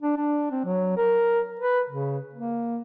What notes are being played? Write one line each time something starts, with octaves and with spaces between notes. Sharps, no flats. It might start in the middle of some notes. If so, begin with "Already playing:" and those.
D4
D4
C4
F#3
A#4
B4
C#3
A#3